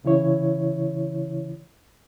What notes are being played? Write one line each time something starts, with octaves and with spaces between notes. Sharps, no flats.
C2 C#3 E3 E4 C#5